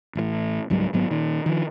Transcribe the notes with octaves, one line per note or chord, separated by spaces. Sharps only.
A1 A2
C#2 G#2 F#3 G3
G#1 G#2 F#3 B3
A#2 D#3
D#3 F3